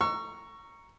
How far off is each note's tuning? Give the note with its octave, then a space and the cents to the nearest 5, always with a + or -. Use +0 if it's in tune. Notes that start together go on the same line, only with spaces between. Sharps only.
A#5 +0 C#6 +0 E6 +40